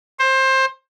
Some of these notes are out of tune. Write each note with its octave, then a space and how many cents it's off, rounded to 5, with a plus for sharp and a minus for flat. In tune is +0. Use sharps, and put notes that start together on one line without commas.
C5 +20